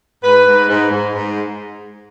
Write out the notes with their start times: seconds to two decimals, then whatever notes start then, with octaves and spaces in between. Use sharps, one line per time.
0.23 G#2 B4
0.46 G#2
0.68 G#2
0.91 G#2
1.13 G#2